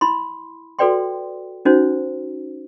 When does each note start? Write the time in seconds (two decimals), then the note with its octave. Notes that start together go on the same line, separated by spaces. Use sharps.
0.01 E4 B5 C6
0.79 F#4 A4 B4 D5 G5 C6
1.65 C#4 D#4 E4 F#4 C5